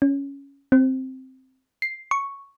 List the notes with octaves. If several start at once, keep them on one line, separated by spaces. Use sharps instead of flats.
C#4
C4
C7
C#6